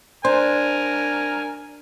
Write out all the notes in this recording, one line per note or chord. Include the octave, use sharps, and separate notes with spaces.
D4 A#4 C5 G#5 A#5